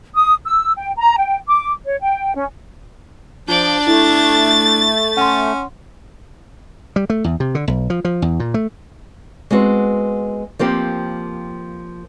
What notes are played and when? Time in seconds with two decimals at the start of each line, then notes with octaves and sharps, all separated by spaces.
0.15 D#6
0.44 E6
0.76 G5
0.96 A#5
1.17 G5
1.47 D6
1.85 C#5
2.00 G5
2.34 C#4
3.48 F3 D4 F4 D5 G6
3.87 A3 E4 A6
5.17 C#4 F#5 C6
6.96 G3
7.10 A3
7.24 E2
7.40 C3
7.55 D3
7.68 B1
7.90 F3
8.05 F3
8.22 E2
8.40 A#2
8.54 A3
9.51 G#3 B3 C4 F#4
10.59 F3 A#3 C4 G4